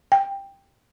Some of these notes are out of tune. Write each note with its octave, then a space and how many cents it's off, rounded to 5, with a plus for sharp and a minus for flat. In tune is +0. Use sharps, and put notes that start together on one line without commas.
G5 +10